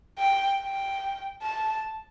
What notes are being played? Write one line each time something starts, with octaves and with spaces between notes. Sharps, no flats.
G5
G5
A5